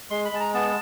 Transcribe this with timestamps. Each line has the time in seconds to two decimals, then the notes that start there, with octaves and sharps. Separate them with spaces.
0.10 G#3 C6
0.25 B5
0.32 G#3 A5
0.40 A#5
0.54 B3 A5